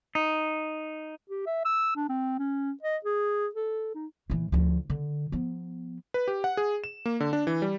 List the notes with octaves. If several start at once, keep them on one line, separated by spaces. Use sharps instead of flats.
D#4
G4
E5
E6
D4
C4
C#4
D#5
G#4
A4
D#4
A#2 E3
D2 F3
D3
F3 B3
B4
G4
F#5
G#4
E7
A#3
D3
D4
E3
G3